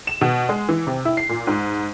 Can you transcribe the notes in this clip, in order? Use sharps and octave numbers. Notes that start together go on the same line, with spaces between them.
E7
B2
G#3
E3
C3
E4
C7
A#2
G#2